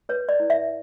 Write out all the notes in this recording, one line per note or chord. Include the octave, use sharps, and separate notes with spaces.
B4 C#5
D5
E4
E5